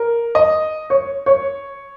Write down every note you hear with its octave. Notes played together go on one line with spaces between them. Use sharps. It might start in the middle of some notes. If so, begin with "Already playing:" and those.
Already playing: A#4
D#5
C#5
C#5